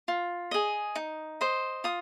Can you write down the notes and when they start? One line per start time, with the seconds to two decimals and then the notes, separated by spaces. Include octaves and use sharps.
0.08 F4
0.51 G#4 D#5
0.96 D#4
1.41 C5 D#5
1.84 F4 D#6